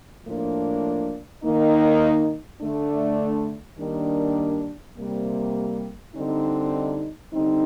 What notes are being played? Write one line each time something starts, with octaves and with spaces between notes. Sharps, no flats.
A2 F3 A#3 D4
D#3 A#3 D#4
D3 A3 D4
D#3 G3 A#3 D4
C3 G3 A#3
D3 G3 C4 D#4
D3 G3 C4 D#4